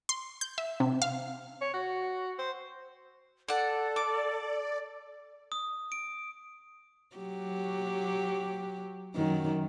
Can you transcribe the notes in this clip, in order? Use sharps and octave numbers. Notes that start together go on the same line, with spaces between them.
C6
G6
E5
C3
F5
C#5
F#4
C5
A4 D5 F#5
D5 D6
D#6
D7
F#3 G4
F#2 D#3 F#3